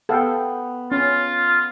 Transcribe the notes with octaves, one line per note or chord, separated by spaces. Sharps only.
B3 A4 F5 G5
C#4 F4